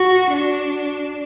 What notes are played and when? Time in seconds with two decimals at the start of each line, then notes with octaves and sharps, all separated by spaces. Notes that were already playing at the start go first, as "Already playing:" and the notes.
Already playing: F#4
0.32 D4